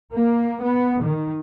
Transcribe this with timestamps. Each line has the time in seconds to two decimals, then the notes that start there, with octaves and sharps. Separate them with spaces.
0.14 A#3
0.62 B3
1.02 D#3